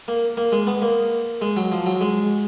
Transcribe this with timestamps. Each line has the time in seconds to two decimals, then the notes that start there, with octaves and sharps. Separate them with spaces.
0.08 A#3
0.37 A#3
0.52 G#3
0.67 B3
0.82 A#3
1.41 G#3
1.57 F#3
1.72 F3
1.86 F#3
2.01 G#3